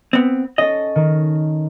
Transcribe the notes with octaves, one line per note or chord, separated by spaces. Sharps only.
B3 C4
C#4 A4 D#5
D#3